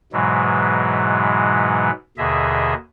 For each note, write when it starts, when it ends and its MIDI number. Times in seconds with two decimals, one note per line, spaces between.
0.13 1.91 44
0.13 1.91 47
0.13 1.91 52
0.13 1.91 54
0.13 1.91 56
2.18 2.74 39
2.18 2.74 47
2.18 2.74 50
2.18 2.74 68
2.18 2.74 75
2.18 2.74 76